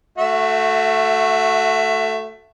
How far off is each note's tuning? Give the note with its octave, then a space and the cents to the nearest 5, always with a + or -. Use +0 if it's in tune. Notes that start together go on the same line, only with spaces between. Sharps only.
A3 +0 F#4 -10 E5 +25